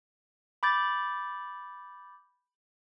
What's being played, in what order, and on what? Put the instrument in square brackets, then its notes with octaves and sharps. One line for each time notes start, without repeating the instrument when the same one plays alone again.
[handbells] B5 D6 G6 A6